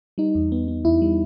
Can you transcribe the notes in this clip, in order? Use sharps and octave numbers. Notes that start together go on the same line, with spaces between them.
G3 D#4
E2
B3
B3
E2 E4
G3